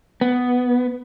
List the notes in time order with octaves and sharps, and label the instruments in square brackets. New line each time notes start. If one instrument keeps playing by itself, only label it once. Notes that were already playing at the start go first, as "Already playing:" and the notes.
[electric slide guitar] B3